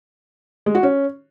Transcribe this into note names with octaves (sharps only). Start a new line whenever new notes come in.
G#3
F#4
C#4